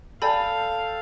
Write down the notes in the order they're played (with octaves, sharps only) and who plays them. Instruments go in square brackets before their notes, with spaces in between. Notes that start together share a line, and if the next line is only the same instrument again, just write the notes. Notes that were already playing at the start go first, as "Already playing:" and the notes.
[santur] A4 G5 [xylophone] D5 G#5 B5 [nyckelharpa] F5